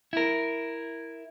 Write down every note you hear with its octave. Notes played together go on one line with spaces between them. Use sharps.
E4 A#4